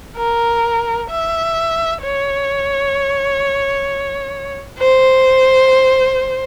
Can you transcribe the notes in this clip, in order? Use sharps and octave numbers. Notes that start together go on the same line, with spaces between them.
A#4
E5
C#5
C5